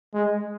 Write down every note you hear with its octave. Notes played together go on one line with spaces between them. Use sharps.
G#3